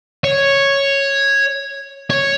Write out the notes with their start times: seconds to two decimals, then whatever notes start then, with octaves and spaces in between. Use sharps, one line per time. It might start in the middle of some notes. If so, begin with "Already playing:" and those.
0.24 C#5
2.10 C#5